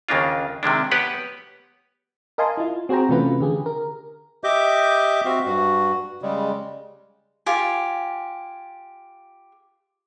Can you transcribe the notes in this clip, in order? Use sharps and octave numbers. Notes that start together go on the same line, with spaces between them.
D#2 C#3 A#3 D4 F4
C3 D#3 G#3 D4
B3 G4 B4 C#5 F#5
A#4 D#5 F5 G#5 A5 C6
E4 F4
C4 F#4 G#4 C5 G5 A#5
C3 E3 A3 C#4 F4 B4
D3 G4 G#4
A#4
G4 D#5 E5 D6 G6
C4 F#4 E5 F5
G2 F#4
C#3 G3 G#3
F4 G4 G#5